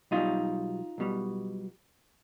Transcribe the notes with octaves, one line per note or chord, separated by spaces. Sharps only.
B1 B2 G3 D#4 F4
B1 B2 G3